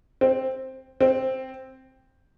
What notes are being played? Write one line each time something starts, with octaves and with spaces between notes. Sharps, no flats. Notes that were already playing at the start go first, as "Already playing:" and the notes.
C4
C4